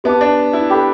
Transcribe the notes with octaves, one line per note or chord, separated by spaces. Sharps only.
B3 G4 E5 A5 D6
D4
E4
G4 A4 G5 B5 D6